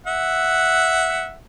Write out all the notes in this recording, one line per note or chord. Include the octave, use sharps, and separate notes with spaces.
E5 F#5